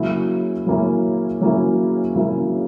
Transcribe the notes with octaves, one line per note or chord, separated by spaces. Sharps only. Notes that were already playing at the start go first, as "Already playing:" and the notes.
Already playing: C#3 F#3 A#3 C#4 E4
C#3 F#3 A#3 C#4 E4
C#3 F#3 A#3 C#4 E4
C#3 F#3 A#3 C#4 E4